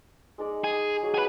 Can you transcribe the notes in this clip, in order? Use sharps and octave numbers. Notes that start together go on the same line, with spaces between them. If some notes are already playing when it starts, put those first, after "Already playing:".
G#3 D#4 D5
G#4
F#3 G#4
G#4 B4 F#5